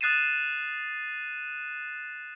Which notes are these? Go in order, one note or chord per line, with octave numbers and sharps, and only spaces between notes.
D#6 F#6 A6 C7 D#7 E7